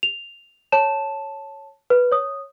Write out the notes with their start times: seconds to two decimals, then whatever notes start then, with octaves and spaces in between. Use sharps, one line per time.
0.03 F7
0.72 C#5 A5 E7
1.90 B4
2.12 C#5 D#6